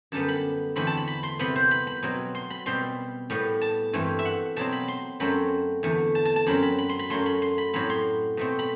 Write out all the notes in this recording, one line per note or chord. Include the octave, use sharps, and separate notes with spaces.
F#2 D3 G3 B3 A5
B5
E2 D3 A3 C4 B5
A5
B5
B5
C6
C3 G3 B3 B5
C5
B5
B5
B2 F#3 C4
C6
B5
B2 G3 C4 C6
A2 G3 B3
A5
G2 E3 A3 C4
E5
F#5
B2 F#3 C4 A5
B5
C6
F#2 F#3 A3 C4 B5
E2 D3 A3
A5
A5
A5
F#2 F#3 C4 B5
B5
B5
C6
B5
F#2 F#3 A3 C6
B5
C6
B5
A2 F#3 C4 B5
C6
B2 A3 C4
B5